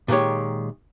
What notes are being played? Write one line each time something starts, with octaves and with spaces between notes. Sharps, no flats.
A#2 D#3 G#3 G4 C#5